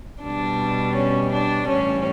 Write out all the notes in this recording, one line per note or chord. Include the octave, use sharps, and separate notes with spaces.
B2 G3 D4
C#4
D4
A2 E3 G3 C#4